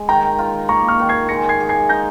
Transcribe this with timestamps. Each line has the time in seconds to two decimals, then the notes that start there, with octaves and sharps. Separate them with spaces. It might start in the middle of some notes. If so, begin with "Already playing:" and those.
Already playing: G#3
0.09 D#3 G5 A#5
0.38 F4
0.68 A#3 A#5 C#6
0.89 C#6 F6
0.99 D#3
1.09 G#6 C7
1.29 G#3 A#6 C#7
1.49 G#6 C7
1.60 G#4
1.69 G#6 C7
1.89 D#4 G6 A#6